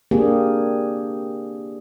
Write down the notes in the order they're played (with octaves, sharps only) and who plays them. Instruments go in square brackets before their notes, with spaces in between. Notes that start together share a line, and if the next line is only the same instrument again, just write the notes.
[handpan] A#3 C4 D4 G4 G#4